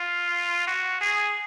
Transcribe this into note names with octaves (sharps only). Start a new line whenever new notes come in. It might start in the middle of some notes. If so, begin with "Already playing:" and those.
Already playing: F4
F#4
G#4